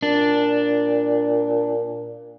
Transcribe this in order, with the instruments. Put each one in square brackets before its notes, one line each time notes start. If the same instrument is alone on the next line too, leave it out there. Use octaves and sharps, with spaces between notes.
[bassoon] A#2 [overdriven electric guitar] D4